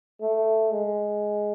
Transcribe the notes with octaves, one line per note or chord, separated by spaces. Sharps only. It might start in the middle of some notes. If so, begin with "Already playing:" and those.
A3
G#3